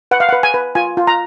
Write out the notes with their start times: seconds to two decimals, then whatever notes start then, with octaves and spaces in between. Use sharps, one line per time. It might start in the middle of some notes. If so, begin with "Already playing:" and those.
0.11 B4 F#5
0.20 F5
0.29 B4 F#5
0.43 G#5
0.54 B4
0.75 F4 G#5
0.97 F4
1.07 A#5